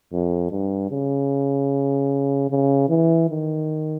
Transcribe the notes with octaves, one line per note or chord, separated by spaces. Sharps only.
F2
G2
C#3
C#3
E3
D#3